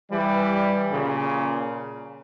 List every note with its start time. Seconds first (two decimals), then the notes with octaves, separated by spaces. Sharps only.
0.11 E3 G3
0.91 A#2 C#3